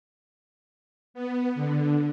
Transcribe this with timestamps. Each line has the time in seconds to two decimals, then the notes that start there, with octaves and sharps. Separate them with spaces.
1.14 B3
1.55 D3